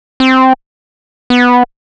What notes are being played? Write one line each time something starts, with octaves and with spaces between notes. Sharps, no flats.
C4
B3